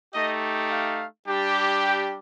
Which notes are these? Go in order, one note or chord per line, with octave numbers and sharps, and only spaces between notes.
A3 D#4 G4 D#5
F5
G3 D4 G4
G5